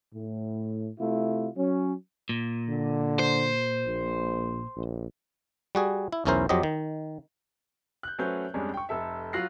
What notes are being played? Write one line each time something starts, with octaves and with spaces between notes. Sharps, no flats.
A2
C3 A3 E4 F4
F#3 C#4
A#2
D3
C5
A#1
A#1
G3 F#4 G#4
E4
B1 E2 C#4 E4 A#4 C5
F2 F#3 G4 C5 D#5
D#3
F#6 G6
F#3 A3 C#4 B4 C5 G6
F2 G3 G#3 C#4 D4
G5 C#6
F1 A4 E5
F#3 F4 F#6 A#6 C7